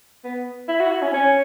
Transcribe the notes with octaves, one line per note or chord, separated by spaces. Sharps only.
B3
E4
F#4
E4
C#4
C#4